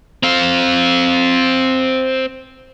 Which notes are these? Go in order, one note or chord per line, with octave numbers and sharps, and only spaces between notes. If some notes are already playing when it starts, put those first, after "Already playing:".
C4 F5